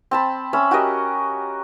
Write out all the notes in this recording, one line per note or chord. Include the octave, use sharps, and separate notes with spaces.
C4 A5 B5
C#4 E5 B5
F#4 G4 A#4 D#5